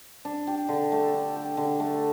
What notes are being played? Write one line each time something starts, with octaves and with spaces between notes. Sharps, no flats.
D4
G4
D3
A3
D4
G4
D3
A3